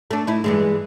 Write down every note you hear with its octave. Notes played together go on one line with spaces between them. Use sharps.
A3 D4
D#4 E4
G2 E3 G#3